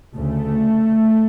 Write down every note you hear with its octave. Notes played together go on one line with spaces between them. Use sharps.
D2 C#3 A3